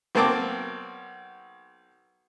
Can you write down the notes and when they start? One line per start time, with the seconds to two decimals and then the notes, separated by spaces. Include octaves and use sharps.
0.15 B1 A#3 C4 A5 D6